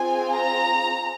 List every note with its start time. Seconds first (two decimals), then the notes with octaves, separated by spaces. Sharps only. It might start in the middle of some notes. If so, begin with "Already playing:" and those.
Already playing: C4 F4 G#4 G#5
0.33 A#5